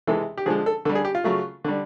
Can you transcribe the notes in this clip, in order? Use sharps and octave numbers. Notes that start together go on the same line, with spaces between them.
C3 E3 G#3 A4
G4
D3 F3 G#3 G#4
A4
D3 G3 A4
G#4
G4
F4
C#3 F#3 A3
D3 G3